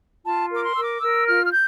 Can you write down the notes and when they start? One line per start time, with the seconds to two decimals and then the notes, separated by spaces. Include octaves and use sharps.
0.25 F4 A5
0.50 A#4 D6
0.63 C6
0.75 A#4 E6
0.82 D6
1.01 A#4 E6
1.27 F4 F6
1.47 F6
1.52 G6